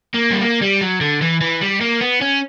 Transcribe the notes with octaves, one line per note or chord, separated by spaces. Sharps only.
A#3
G3
A#3
G3
F#3
D3
E3
E3
G3
A#3
B3
C#4